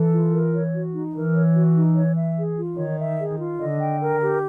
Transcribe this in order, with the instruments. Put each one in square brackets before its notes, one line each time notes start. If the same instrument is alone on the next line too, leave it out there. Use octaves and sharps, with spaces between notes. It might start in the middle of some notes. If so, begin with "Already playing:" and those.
Already playing: [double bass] E3 [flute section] A4
[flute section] F4
A#4
C#5
F#4
D#4
[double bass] E3 [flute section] A#4
[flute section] C#5
F#4
D#4
C#5
E5
G#4
F4
[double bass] D#3 [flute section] C#5
[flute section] E5
G#4
F4
[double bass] D3 [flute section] D#5
[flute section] G5
A#4
G4